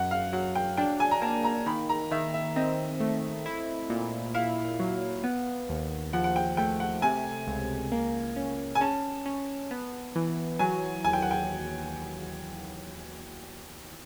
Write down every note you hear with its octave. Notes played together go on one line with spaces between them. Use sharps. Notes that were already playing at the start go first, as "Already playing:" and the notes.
Already playing: F#2 F#5
F5
F#3 F#5
G5
D4 G5
G#5
A#5
A#3 A5
A#5
D#3 B5
A#5
D#3 E5
E5
C4 D#5
A3
E4
A#2
E4 F5
F#3
B3
D#2
F3 F#5
F#5
G5
A3 G5
F#5
C3 G#5
C#2
A#3
C#4
G#5
C#4 A5
C#4
B3
E3
F#3 G#5
D#2 G#5
G5
F#5
G5